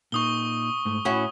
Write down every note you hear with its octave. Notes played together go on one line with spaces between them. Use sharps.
A#2 D#4 C#6 D#6 G7
G#2 A3
A2 C#4 E4 F#4 B5